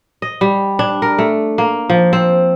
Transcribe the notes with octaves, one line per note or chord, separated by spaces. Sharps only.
D#5
G3
D4
A#4
A3
A#3
F3
C4